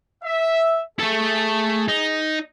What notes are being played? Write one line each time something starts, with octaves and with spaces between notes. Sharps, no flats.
E5
A3 G#4 A4
D#4